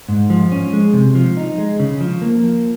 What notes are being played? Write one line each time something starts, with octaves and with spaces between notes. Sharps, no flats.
G#2
F3
C#4
G#3
C3
F3
D#4
G#3
C#3
F3
A#3
F3